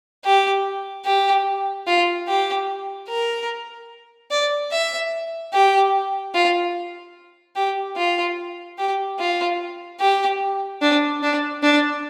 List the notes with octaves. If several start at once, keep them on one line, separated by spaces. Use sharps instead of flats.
G4
G4
F4
G4
A#4
D5
E5
G4
F4
G4
F4
G4
F4
G4
D4
D4
D4